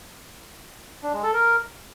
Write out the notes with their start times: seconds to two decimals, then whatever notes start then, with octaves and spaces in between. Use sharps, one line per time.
1.03 D4
1.13 G#3
1.23 A4
1.34 A#4